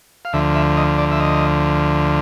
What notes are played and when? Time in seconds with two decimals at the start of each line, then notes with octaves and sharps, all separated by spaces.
0.25 F5
0.33 D2 D3 F3 E5
0.55 E5
0.77 D#5
0.98 D5
1.12 E5
1.20 D#5